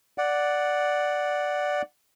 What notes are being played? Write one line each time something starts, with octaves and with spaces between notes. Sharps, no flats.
D5 F#5